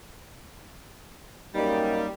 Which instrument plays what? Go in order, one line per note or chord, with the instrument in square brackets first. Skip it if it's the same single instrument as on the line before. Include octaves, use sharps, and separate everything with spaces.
[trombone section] F#2 A#3 D#4 [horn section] G3